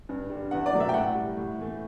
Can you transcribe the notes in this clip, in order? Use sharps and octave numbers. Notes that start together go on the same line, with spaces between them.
G2
D3 G3
E2 F#5
D5
B2 F#3 A3
E5
G5
A2 F#5
G3
A2
E3 A3